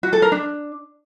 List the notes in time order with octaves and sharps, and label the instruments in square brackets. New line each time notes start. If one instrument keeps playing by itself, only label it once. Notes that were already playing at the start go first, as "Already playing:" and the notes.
[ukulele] F#4
A4
A#4
D4